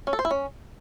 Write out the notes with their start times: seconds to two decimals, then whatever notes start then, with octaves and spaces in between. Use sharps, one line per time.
0.07 C#4
0.13 A4
0.19 C5
0.25 E4
0.31 C#4